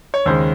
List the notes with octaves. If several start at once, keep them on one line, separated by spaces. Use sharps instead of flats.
C#5
D#2 C#3 G#3 C5